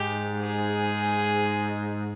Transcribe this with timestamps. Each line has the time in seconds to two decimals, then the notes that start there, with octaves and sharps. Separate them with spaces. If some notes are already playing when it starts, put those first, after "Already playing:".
Already playing: G#2 G4
0.43 G#4